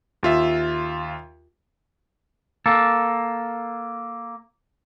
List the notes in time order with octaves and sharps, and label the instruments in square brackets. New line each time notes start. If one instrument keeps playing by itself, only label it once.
[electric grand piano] D#2 F4 E5
[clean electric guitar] A#3 A4